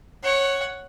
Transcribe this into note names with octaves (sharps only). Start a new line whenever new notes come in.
C#5 F#5